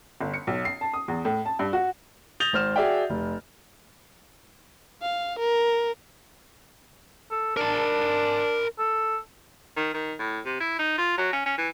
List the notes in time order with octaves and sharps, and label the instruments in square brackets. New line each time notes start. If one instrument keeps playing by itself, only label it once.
[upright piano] G1
C#7
B1
C7
A5
D#6
E2
A2
A5
G2
F#4
[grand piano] D#6 G6 A6 A#6 F7 G7
G#1 C5 F6 E7
F#4 G#4 D5 E5 G5
F1
[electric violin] F5
A#4
[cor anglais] A4
[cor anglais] D4 [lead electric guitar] A#4 A5
[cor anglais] A4
[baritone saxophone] D#3
D#3
A2
C3
E4
D#4
F4
F#3
C#4
C#4
E3